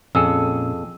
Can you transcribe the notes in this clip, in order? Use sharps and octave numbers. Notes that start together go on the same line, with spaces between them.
F2 A#2 C#4 G#4 A4 E6